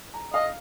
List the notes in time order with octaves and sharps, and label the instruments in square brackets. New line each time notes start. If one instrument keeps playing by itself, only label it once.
[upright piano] A#5
[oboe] D#5 [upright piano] F5